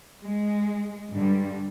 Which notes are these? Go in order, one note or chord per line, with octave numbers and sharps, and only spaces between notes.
G#3
G2 D3 G3